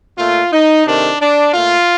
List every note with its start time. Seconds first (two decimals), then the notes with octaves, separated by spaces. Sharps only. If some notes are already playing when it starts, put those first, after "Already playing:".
0.18 A#2 A3 F4
0.53 D#4
0.86 C3 D#3 A3 D4
1.21 D4
1.54 A#2 A3 F4